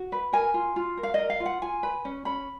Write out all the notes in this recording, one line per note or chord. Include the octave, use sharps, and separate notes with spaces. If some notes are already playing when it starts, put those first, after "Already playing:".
Already playing: F#4
B4
A#4 G#5
F4
F4
A#4
F5
A#4 D#5
F5
F4
F#5
F4 G#5
B4
C#4
C#4 B5